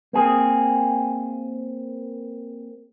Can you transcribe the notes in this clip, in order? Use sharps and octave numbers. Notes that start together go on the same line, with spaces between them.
A#3 C4 G#4